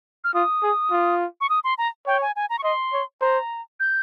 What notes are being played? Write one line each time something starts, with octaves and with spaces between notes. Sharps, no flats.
F6
F4 D#6
G#4
F4
C#6
D#6
C6
A#5
C#5 G5
G#5
G#5
A#5
C#6
D#5 C6
C#5
C5 A#5
G6